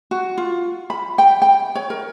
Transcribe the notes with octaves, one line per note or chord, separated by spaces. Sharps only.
F#4
F4
B5
G5
G5
C#5
A#4